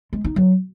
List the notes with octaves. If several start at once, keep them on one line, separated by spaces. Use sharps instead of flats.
G#3
D#4
F#3